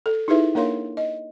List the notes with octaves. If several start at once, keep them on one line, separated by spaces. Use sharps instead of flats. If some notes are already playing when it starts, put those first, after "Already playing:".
A4
D#4 E4 G4 G#4 B4 E5
A#3 D4 A#4 C#5 F5 C6
D#5